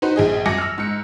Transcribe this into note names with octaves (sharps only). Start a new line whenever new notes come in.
D#4 F#4 B4 C5
A#1 G#4 D#5
F#2 G#5 D6 A#6 C#7
E6 F6
G#2 C#7